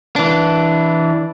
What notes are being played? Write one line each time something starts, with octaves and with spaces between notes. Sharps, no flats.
E3 D4